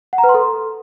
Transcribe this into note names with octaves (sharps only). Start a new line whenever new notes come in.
F#5
A#5
B4
C6
A4